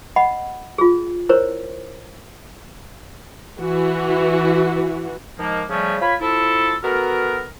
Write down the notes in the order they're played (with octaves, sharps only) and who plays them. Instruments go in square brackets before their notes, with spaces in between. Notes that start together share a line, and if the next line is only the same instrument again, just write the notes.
[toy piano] D#5 F#5 B5
F4 G#4
E4 A#4 C5 C#5
[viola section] E3 F#4
[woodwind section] D#3 F3 G#3 A#3
C#3 F3 G3 A3 C#4
F4 C#5 B5
F3 E4 F4 A4
B3 F#4 A4 A#4